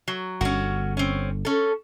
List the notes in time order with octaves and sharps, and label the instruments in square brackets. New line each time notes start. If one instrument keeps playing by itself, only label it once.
[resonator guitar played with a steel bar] F#3
[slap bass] G1 D3 [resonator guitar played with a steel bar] C#4 F#4
[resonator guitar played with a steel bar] C4 C#4
C#4 A4